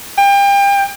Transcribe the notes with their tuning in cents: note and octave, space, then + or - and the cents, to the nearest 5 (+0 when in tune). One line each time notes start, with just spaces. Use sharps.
G5 +35